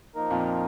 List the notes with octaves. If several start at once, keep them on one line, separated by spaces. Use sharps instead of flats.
F3 A#3 D#4 A#4
F2 A#2